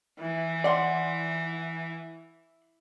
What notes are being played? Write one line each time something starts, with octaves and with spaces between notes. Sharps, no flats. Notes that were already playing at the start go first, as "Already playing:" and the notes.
E3
D5 F#5 C6